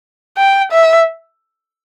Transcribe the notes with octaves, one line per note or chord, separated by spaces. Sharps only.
G5
E5